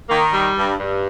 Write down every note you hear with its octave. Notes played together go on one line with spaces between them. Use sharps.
D#3 A#3
G3
G2
G2